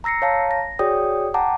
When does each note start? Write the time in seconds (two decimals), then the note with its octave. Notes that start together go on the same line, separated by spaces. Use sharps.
0.04 A#5 E6 A#6 C7 C#7
0.22 C#5 F5 A5 A#5
0.51 A#6
0.79 F#4 G#4 C#5 D5 G5 D#6
1.34 F#5 G5 A5 A#5 D6